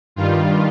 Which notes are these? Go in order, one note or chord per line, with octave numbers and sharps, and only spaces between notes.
G2 D#3 G3 F4